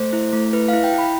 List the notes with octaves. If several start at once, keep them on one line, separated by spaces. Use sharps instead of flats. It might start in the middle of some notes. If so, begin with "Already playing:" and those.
Already playing: A3 C5
E4
A3
E4 B4
F5
E4
G5
E4 B5